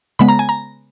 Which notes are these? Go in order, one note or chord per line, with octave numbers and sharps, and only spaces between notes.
C#3 G#3 B3 B5
A#5
G#5
A#5